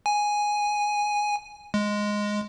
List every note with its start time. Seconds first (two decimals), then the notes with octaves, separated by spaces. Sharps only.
0.06 G#5
1.74 G#3